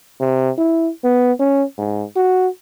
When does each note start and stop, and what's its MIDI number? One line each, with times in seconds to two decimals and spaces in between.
0.21 0.50 48
0.58 0.91 64
1.04 1.32 59
1.40 1.64 61
1.78 2.04 44
2.16 2.48 66